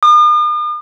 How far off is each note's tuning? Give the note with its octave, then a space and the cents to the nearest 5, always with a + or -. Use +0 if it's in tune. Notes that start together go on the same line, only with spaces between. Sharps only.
D#6 -45